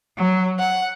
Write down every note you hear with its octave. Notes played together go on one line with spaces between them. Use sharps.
F#3
F#5